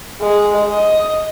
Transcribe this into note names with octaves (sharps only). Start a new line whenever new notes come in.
G#3
D#5